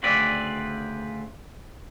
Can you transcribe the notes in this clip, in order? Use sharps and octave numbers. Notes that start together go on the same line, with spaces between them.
D2 C#3 C4 B4 D5